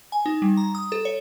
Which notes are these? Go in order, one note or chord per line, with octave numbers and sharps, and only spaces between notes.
G#5
D#4
G3
A#5
D#6
A4
C#5